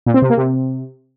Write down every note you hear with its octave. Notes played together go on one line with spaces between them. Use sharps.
A#2
C4
C3
A#3
C3